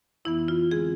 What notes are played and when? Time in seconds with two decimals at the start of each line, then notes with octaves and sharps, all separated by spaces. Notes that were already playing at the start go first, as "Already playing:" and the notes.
0.25 F2 E3 B3 E4
0.48 F4
0.71 D3 G#3 C4 G#4